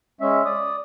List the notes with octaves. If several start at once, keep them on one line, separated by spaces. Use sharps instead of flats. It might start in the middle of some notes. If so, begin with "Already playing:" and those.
G#3 C#4 E5
D5 D#6